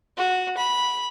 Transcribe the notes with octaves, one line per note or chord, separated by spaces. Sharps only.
F#4
B5